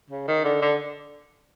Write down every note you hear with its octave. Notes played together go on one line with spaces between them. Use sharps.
C#3
D#3
D3
D3